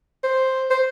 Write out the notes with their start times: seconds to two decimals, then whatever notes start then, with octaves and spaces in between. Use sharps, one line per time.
0.24 C5
0.70 C5